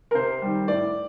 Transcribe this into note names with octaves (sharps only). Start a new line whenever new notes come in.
A#4
C3 C5
D#3 G3
A2 D5